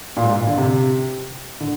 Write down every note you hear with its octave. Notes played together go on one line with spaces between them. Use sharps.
A#2
G#2
A#2
D3
C3
D3